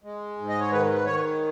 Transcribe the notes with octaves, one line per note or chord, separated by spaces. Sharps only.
G#3
G#2
D#5
C#5
D#3 B4
B4
D#3 C#5